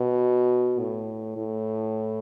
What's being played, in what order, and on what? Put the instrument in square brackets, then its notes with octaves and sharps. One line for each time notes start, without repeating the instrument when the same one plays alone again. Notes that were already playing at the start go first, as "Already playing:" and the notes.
Already playing: [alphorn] B2
A2
A2